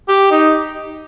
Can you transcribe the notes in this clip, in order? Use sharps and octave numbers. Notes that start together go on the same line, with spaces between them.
G4
D#4